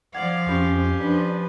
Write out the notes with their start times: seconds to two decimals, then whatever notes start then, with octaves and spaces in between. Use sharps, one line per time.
0.14 F3 D5 F5 F#5 G#6
0.46 F2 C#4 G4 G#5 C#6
0.99 F3 D4 B4